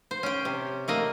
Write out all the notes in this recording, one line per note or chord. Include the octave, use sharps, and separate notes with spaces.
C5
C#4 G5
C3
A3 A#3 D#5